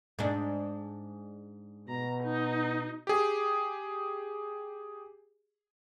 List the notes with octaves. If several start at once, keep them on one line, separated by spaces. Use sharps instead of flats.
G#2 D4
B2 A#5
D#4
G4 G#4